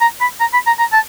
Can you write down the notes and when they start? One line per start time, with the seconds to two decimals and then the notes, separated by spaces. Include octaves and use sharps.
0.01 A#5
0.21 B5
0.40 A#5
0.53 B5
0.67 A#5
0.79 A#5
0.93 A5